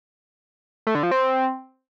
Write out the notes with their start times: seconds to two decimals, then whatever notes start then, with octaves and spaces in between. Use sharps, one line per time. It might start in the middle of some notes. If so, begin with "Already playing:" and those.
0.87 A3
0.95 D3
1.03 F3
1.11 C4